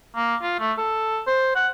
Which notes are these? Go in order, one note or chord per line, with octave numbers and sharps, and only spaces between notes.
A#3
F4
A3
A4
C5
F#5